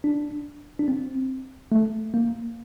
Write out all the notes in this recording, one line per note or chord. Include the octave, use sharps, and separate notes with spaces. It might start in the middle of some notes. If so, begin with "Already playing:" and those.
D4
D4
C4
A3
A#3